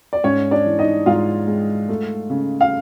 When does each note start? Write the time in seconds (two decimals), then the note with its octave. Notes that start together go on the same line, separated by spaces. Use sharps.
0.13 D5
0.24 G#2 C#4 C#5
0.51 D4 D5
0.66 E3
0.79 D#4 D#5
1.06 G#2 F4 F5
1.47 G#3
1.89 A3
2.30 C#3
2.61 F5